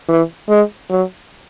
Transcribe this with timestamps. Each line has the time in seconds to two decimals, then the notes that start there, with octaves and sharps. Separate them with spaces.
0.08 E3
0.49 G#3
0.90 F#3